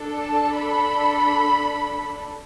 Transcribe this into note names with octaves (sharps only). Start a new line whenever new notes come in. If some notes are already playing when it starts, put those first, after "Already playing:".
Already playing: D4 A4
A5
B5